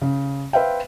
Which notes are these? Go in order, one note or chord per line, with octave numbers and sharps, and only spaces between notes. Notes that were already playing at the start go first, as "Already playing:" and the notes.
C#3
B4 C5 E5 F5 G5